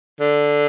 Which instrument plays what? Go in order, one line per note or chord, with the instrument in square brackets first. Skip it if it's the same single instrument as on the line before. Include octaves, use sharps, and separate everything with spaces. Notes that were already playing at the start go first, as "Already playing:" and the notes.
[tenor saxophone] D3